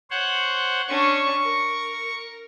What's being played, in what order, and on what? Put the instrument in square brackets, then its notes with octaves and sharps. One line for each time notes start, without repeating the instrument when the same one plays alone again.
[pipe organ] C5 C#5 F#5
[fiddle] C#4 D4 [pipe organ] C#6
[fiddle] A#4